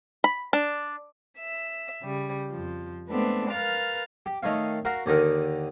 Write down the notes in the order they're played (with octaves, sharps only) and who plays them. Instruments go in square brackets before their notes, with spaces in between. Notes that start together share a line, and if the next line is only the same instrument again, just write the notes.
[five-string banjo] B5
D4
[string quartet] E5
C#3 G3
F2 F3
G#3 A3 B3 C4 D4 A4
A#4 B4 F5 F6 A6
[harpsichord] G4
D#3 A3 D#4 C#5 F5
F#4 A#4 F5
D#2 D3 D#3 D#4 A#4